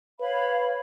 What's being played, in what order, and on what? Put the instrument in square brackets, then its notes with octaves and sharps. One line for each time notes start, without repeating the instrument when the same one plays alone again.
[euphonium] B4 [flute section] C#5 F5 B5